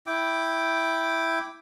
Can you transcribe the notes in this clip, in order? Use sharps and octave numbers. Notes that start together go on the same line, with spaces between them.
E4 G5 D6